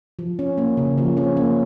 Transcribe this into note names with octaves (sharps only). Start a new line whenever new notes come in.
F3
C#4
A#3
C#3
F3
C#4
A#3